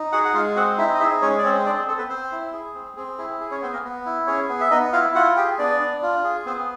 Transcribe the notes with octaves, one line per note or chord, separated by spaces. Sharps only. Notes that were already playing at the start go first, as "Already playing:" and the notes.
Already playing: D#4
F#4 G#4 F#5
F#5
G#3 F4 F5
C4 F#4 F#5
D#4 E4 E5
D#5
E4 G#4 E5
G#3 C#4 C#5
D5
C4 C#4 C#5
D4 G#4 D5
G#4
C4 A4
B3 B4
C4 C5
E4
G#4
C4
C4 G#4
E4 G#4
G#4
C#4 C#5
B3 C4 C5
A#3 A#4
B3
E4
C#4 G#4 C#5
B3
E5
B3 D#4 D#5
E4 F4 F5
F4 F#4 F#5
G4 G#4 G5
B3 D4 D5
D4
F4
G#4
B3 C4 C5